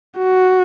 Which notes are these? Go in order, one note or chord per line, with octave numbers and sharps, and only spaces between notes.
F#4